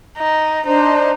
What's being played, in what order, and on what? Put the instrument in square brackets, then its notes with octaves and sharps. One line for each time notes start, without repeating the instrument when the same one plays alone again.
[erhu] D#4
[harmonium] D4 C5 [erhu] D#4